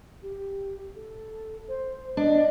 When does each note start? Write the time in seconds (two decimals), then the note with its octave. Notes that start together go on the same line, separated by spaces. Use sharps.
0.23 G4
0.95 A4
1.68 C5
2.17 D4 D#5